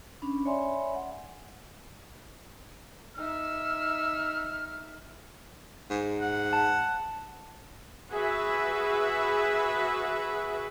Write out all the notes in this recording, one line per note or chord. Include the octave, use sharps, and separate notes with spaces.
C#4 D4 B5
C#5 D5 E5 G#5 B5 C6
F#5
D#4 E5 E6 F6
G#2
F#5
A5
F#4 G#4 B4 E5